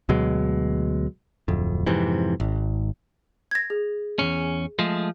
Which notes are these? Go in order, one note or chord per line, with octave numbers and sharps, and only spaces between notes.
D2 B2 F#3 G#3
D1 F2
F2 G#2 C3 E3
G#1
G#6 A#6
G#4
E2 G2 C#4
F3 G#3 A3